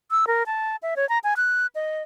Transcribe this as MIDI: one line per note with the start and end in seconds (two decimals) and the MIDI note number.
0.11 0.25 88
0.27 0.43 70
0.46 0.76 81
0.83 0.94 76
0.96 1.08 73
1.09 1.19 82
1.24 1.34 80
1.37 1.67 90
1.75 2.03 75